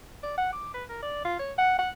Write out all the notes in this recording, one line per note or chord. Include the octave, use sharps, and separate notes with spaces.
D5
F#5
D6
B4
A#4
D5
F4
C#5
F#5
F#5